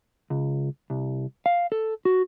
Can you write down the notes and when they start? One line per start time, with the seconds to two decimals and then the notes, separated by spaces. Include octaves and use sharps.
0.30 C#2
0.90 C2
1.46 F5
1.72 A4
2.05 F#4